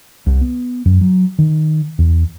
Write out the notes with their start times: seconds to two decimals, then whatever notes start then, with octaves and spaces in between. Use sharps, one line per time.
0.26 C2
0.41 B3
0.85 F#2
1.01 F#3
1.39 D#3
1.98 E2